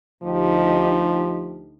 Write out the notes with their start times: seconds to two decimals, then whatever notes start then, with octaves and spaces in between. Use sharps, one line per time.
0.23 D2 F3 D#4 G4